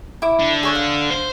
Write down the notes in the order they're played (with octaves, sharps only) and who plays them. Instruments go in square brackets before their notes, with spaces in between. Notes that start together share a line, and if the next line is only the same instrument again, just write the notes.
[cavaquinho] E4 D6
[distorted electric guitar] D3
[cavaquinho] G#4 C#5 E5
F5
[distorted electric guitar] C5